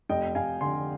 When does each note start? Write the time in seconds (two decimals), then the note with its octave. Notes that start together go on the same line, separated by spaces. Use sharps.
0.09 F1 D#5 G5
0.35 F1 F5 G#5
0.61 D3 G#5 C6